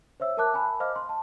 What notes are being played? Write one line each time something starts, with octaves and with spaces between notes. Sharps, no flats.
C5 C#5 E5 E6
A#4 E5 A5 D6 F#6
G#5 A5 B5
C5 D#5 F5 D6 F6
C6
A5